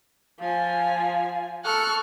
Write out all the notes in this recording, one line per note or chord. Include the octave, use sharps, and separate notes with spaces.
F3 F5 G#5
A4 C#6 F6 F#6